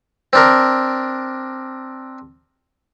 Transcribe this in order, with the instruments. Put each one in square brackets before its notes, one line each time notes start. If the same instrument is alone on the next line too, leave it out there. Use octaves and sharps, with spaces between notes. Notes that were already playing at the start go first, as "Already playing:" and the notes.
[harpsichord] C4 D4 A#4